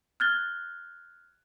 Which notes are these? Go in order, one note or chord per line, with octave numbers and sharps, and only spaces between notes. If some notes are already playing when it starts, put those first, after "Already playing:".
F6 F#6 G#6 A6 G7